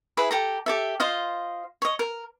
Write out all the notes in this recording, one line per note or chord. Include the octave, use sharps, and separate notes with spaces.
E4 G#4 B4 E5
G4 A4 A#5
G4 A4 E5
F4 C5 D#5 F5
C#5 D#5
A#4